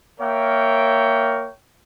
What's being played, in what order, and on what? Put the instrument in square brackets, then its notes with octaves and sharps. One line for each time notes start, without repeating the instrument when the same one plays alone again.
[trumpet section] A#3 A#4 C#5 E5 G5